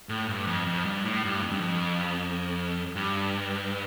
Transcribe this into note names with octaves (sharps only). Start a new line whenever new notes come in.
A2
G2
F2
F2
G2
A2
G2
F2
G2
F2
G2